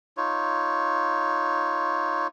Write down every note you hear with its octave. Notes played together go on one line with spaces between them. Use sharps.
D#4 F4 C#5